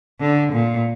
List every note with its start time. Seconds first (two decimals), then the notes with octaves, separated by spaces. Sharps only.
0.20 D3
0.53 A#2